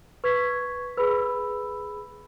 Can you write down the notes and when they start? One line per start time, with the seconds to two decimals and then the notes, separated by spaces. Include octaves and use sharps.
0.24 B4 C#6 G#6 B6
0.97 G#4 B4 B5 E6